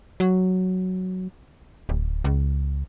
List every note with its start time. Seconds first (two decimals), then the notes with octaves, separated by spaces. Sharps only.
0.20 F#3
1.89 D1
2.24 C#2